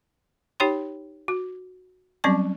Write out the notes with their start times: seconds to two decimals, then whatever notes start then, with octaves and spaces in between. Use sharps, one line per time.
0.60 D#4 G4 C#5 G5 C6
1.28 F#4
2.24 F#3 G3 C4 C#4 A5 C#6